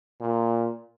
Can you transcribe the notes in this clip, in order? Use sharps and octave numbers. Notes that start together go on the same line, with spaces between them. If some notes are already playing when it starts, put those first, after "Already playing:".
A#2